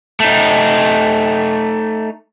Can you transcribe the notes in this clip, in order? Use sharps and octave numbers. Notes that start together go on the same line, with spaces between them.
A3 D#4